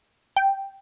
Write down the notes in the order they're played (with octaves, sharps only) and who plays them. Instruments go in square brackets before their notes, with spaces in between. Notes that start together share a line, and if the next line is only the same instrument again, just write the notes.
[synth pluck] G5